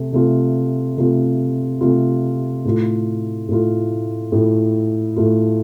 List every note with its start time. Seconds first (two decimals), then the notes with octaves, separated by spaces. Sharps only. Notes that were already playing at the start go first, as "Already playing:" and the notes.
Already playing: C3 A3
0.13 C3 A3 F4
0.97 C3 A3 F4
1.81 C3 A3 F4
2.65 A2 A3 F4
3.49 A2 A3 F4
4.32 A2 A3 F4
5.16 A2 A3 F4